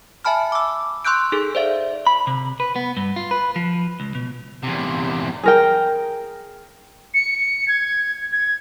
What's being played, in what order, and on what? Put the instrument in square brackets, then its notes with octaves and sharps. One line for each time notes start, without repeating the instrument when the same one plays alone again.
[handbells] E5 G#5 A5 B5 F6
D6 E6
C6 C#6 E6 F#6 G6 D7
D#4 G#4 A4
C5 D5 E5 F5
[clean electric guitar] B5
C3
B4
B3
G2
F4
B4
F3
C#2
B2
[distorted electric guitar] E2 C3
[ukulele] G#4 A#4 G5
[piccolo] C#7
G#6
G#6